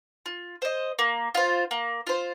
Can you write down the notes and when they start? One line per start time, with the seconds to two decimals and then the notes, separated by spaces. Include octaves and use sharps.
0.26 F4
0.62 C5 D#5
0.99 A#3
1.35 F4 C5
1.71 A#3
2.07 F4 C5